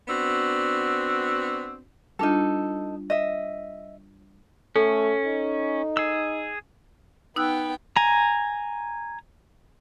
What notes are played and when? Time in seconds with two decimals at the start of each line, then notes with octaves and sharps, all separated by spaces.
0.08 B3 C4 D4 F#4
2.19 G3 D4 D#4 F4 A4
3.10 D#5 E5
4.76 A3 C#4 A4
5.25 D#4
5.97 G#4 E6
7.36 B3 D#4 G5 E6 F#6
7.96 G#5 A#5